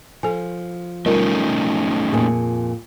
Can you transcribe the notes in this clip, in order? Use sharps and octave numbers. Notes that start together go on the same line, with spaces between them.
F3 A4 G#5
G3 A3 C#4 D#4 F4 A#4
F2 A#2 G#4